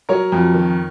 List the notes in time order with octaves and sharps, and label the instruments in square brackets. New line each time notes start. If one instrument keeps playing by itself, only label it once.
[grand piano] F#3 A#4 C#5
F2
D#3